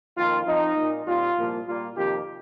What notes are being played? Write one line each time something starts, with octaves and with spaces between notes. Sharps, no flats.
F2 D#3 A#3 F4
F2 F3 C4 D#4
A#2 A#3
A#2 G3 C4 F4
C2 A#2 F3 A#3
A#2 G3 A#3 F4
F2 C3 D#3 A#3 G4